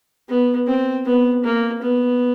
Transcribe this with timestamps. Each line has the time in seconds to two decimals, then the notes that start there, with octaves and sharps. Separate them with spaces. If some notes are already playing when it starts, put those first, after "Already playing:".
0.28 B3
0.67 C4
1.05 B3
1.44 A#3
1.82 B3